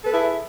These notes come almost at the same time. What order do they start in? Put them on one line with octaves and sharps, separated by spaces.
A4 B4 G#4 E4